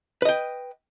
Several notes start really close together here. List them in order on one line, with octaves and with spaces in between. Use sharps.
B4 D#5 G5